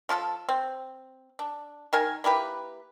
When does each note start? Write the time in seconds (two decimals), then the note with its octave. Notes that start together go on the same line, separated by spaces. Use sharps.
0.09 F3 F4 G4 A4
0.49 C4
1.39 D4
1.93 D#3 A#4 G#5
2.24 A#3 E4 G4 B4